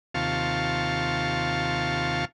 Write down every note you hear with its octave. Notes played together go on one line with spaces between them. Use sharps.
D#2 C3 F4 F5 A5 C#6